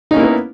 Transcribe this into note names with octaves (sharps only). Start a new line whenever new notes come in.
A#3 B3 C#4 D#4 E4